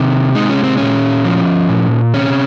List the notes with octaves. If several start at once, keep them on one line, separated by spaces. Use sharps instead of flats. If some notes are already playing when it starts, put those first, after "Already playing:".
Already playing: C3 D#3
G#3 D#4
C#4
C4
A#2 C#4
F3
A#2
C3 C#4